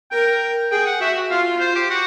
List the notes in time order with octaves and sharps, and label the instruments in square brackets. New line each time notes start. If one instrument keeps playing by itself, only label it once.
[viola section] A#4 [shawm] G5
[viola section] G#4 [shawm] G5
[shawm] F#5
[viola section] F#4 [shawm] E5
[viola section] F4 [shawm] F5
[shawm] C5
G4
F#4